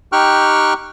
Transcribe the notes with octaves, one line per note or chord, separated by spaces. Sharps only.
D#4 G4 G5 C#6 F6 F#6